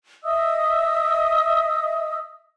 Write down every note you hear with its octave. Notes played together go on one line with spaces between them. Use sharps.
D#5 E5 D#6 E6